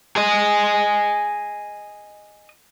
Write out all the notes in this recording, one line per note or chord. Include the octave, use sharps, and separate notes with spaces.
G#4 D#5